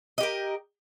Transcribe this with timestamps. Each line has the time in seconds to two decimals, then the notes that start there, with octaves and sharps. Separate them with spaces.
0.18 D#5
0.20 G4
0.23 A#4